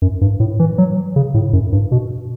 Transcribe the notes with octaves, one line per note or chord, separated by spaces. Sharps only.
F#2
G2
A2
E3
F#3
C#3
A2
F#2
G2
B2